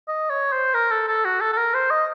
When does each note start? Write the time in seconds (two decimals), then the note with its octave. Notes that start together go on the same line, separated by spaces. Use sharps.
0.08 D#5
0.30 C#5
0.53 C5
0.74 A#4
0.91 A4
1.08 A4
1.24 F#4
1.41 A4
1.52 A4
1.57 A#4
1.74 C5
1.90 D#5